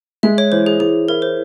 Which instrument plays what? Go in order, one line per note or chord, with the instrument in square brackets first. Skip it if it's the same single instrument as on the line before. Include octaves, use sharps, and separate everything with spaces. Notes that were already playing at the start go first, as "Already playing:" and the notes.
[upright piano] G#3 [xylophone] E5
[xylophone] C#5
[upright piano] E3 [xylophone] C5
[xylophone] G#4
[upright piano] E3 [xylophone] G#4
[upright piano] E4 [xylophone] A#4
[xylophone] C5